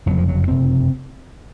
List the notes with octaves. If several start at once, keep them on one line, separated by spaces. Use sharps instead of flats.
F#1 F2 C3 F#3
F3
F#3
F#1 F2 C3 C4